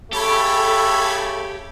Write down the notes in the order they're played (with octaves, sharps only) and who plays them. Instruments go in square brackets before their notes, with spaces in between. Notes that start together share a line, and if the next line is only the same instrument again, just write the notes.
[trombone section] C#3 A3 [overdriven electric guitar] G4 [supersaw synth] A4 B5 G#6